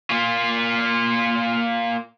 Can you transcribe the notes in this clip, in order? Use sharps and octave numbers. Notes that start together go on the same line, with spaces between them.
A#3 F4